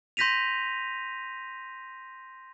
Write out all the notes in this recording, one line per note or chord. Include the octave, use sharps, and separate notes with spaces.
C6 G6 A#6 B6 D#7 F7